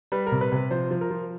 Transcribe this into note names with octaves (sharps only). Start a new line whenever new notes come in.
G3 B4
A#4
C3
B4
C3 B4
F3 C5
F3
A#4
F3